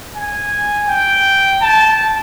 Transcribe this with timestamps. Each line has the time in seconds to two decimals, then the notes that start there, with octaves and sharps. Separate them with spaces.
0.16 G#5
0.89 G5
1.62 A5